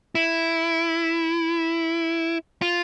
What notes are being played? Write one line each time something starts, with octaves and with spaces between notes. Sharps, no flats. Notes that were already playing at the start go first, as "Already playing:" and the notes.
E4
F4